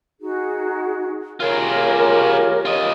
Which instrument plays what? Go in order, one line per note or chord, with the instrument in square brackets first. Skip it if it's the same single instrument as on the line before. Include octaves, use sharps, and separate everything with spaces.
[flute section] D#4 F#4 G#4
[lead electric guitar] F4 G#4 [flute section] G4 A#4 C#5
[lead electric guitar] F4 D#5